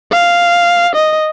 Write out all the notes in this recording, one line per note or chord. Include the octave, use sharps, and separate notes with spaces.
F5
D#5